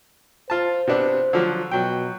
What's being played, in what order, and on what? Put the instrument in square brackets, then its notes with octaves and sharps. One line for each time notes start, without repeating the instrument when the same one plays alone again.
[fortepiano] F4 A5 [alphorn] C5
[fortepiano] C3 B3 D4
D3 F3 F#3
[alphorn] B2 [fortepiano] F#3 G5